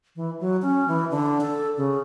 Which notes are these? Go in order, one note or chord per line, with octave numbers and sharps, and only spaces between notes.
E3
F#3
C#4
E3
D3
A4
C#3